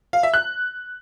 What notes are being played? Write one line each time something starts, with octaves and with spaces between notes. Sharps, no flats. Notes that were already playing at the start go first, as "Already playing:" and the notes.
F5
E5
F#6